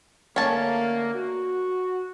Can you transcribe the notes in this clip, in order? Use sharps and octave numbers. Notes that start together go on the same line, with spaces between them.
D3 A3 A#3 C#4 A5
F#4